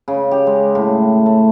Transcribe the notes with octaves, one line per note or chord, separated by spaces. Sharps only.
C#3
G4
G#3
A2
A3